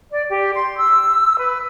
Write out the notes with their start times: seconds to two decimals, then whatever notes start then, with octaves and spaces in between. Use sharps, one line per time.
0.10 D5
0.29 G4
0.54 C6
0.78 E6
1.38 B4